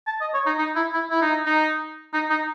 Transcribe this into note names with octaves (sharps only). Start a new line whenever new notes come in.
A5
D#5
C#5
D#4
D#4
E4
E4
E4
D#4
D#4
D#4
D#4